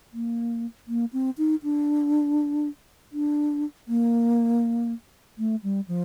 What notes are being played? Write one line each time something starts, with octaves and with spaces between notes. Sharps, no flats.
A#3
A#3
C4
D#4
D4
D4
A#3
A3
G3
F3